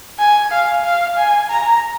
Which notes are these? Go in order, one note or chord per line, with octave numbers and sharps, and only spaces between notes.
G#5
F5
F5
G#5
A#5